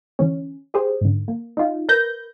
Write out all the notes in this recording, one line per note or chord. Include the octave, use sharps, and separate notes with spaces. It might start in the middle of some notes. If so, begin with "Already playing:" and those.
D3 E3 C#4
G4 G#4 C5
G#2 D3
A#3
D#4 F4
A#4 B4 G6 A#6